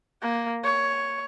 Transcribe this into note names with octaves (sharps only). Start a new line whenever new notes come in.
A#3
C#5